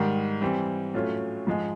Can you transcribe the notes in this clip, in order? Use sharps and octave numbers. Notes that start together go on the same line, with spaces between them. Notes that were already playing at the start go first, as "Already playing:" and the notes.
Already playing: G#2 D#3 G3
E3 G3 C4
A2 F#3 A3 C#4 F4
G#2 F3 G#3